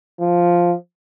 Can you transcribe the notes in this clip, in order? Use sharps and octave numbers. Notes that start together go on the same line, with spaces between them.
F3